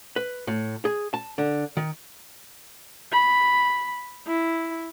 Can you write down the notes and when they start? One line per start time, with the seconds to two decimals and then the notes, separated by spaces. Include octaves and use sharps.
0.16 B4
0.47 A2
0.85 G#4
1.14 A5
1.38 D3
1.77 D#3
3.12 B5
4.27 E4